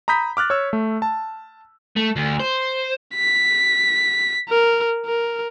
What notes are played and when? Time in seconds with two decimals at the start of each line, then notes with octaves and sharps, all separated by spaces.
0.08 A#5 B5 D#6 G6 B6
0.37 D6 F6 F#6 A6
0.50 C#5 E6
0.73 A3
1.02 A5
1.97 A3
2.16 D2
2.40 C5
3.15 B6
4.49 A#4
5.06 A#4